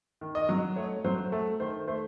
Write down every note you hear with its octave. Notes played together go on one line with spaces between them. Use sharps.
D#3
D#5
F#3
A3 C#5
F#3 C5
A3 A4
D#3 C5
A3 C5